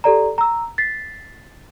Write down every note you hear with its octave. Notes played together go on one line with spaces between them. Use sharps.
G4 A4 D5 A#5
A#5 E6
A6 B6 C7